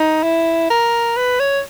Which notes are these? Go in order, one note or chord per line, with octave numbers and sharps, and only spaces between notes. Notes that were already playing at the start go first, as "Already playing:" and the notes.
Already playing: D#4
E4
A#4
B4
C#5